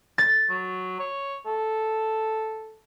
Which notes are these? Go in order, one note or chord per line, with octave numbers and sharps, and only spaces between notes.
A6
F#3
C#5
A4